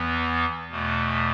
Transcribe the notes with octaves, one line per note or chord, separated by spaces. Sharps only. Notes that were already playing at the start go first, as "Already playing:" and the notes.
Already playing: E2 E3 B3
E2 B2 A3